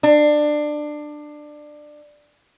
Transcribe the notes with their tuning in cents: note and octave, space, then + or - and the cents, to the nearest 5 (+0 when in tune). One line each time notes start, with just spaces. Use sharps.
D4 +20